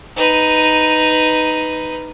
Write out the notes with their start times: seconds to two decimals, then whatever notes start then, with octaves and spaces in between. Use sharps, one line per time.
0.17 D#4 B4